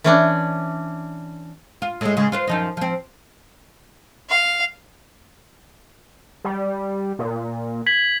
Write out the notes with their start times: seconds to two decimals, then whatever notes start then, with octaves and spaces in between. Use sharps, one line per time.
0.04 E3 C#4 D4
1.82 F4
2.01 A2 G#3
2.17 C#3 G#3
2.32 F4 B4 C5
2.47 F#2 F3 D#4
2.77 F3 C4
4.30 F5
6.44 G3
7.19 A#2
7.86 G#6 B6 F#7